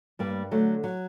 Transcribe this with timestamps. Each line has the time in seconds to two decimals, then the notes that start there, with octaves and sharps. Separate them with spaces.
0.19 G2 G3 A#3
0.51 D3 F#3 A3
0.84 F#3